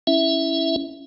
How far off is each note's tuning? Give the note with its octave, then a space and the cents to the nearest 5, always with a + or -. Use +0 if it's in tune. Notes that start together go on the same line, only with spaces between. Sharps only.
C#4 +0 E4 +0 E5 +0